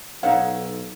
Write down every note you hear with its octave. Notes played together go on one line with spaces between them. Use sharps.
B1 D#4 A4 C5 C#5 F5 F#5